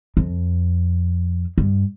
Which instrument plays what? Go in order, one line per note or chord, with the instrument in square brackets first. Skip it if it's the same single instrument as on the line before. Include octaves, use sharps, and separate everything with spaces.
[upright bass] F2
G2